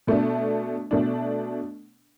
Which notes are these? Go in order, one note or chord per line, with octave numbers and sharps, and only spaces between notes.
B2 A3 D4
B2 A3 D4